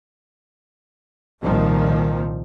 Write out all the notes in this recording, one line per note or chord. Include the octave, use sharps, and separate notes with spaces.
C2 A#2 D#3 F3